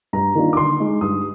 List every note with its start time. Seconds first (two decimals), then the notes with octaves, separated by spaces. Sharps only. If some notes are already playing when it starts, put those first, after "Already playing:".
0.13 G2 A#5
0.35 D#3 A#3 D4 F4
0.53 D6
0.57 D3 C6
0.80 G#3 D#4
1.01 G2 D#6